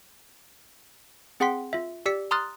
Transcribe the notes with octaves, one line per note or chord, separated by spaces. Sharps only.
C4 G#4 F#5 G5 C6 B6
F4 E5
G4 D5 E6 B6 C#7
A#5 C6 D#6 F6 F#6 A6